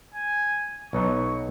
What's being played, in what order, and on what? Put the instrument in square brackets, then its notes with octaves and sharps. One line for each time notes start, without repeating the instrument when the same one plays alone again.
[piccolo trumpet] G#5
[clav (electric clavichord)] B1 B2 F#3 D#4 [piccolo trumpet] C#6